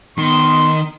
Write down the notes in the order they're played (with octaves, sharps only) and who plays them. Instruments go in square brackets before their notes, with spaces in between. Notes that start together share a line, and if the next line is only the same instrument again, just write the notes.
[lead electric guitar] D#3 [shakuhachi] B3 [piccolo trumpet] C6